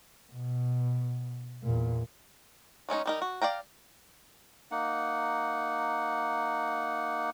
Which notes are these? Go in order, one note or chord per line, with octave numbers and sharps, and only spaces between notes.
B2
E2 A#2
F#3 G#3 C#4 D#4
G3 D#4 A#4
F#4
D5 F5 G5 A#5
A#3 D#4 F#5